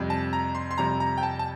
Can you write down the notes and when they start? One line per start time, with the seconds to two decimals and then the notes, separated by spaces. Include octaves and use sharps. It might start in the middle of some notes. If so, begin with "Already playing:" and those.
Already playing: F2 C3 G3
0.10 A5
0.33 A#5
0.55 C6
0.71 C6
0.78 F2 C3 G3 A#5
1.00 A#5
1.18 G5
1.23 A5
1.39 A5